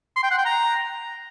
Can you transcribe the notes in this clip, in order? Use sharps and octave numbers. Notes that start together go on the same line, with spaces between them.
C6
G5
F#5
G5
A#5